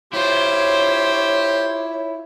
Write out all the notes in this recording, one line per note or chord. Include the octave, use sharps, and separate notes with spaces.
E4 F4 G4 C5 C#5